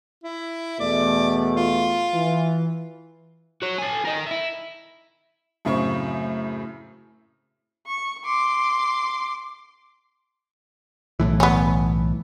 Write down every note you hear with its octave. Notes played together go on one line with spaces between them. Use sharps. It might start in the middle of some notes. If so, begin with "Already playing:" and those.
E4
E2 B2 A3 D5
F4
E3
F#4 C#5
A4 G#5
A#4 D#5
E4 E5
F#2 A2 C#3 C4 C#6
C#6
C6 D6
B1 A2 E3
B3 C#4